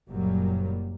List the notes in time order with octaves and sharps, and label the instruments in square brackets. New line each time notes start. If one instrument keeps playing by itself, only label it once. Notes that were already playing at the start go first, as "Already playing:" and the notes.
[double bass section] F#1 F#2 A#2 F#3 G3 A#3